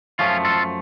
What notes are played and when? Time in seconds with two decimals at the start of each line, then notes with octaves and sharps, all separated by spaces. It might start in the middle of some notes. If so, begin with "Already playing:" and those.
0.19 F#2 F3 A3 C#4 F4
0.45 F4 A4